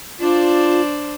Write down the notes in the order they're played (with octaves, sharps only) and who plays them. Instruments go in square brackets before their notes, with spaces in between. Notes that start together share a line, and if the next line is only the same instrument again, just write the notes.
[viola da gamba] D4 C5 D5 [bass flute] F4